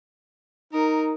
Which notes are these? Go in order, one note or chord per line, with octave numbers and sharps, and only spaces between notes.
D#4 A#4